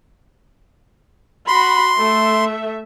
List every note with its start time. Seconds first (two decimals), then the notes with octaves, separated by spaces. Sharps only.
1.48 F#4 B5 C6
1.96 A3 E5